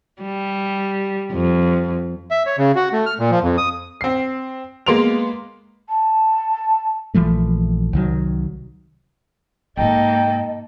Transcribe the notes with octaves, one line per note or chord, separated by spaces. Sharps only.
G3
F2
E5
C#5
C#3
F#4
A3
F6
A#2
F3
F2
D#6
C4 C7
G#3 A#3 B3 C6 D7 F7
A5
A#1 E3 F3 A3
C2 D#3 F#3
G#2 C3 A#3 D#4 A4 D#5 G5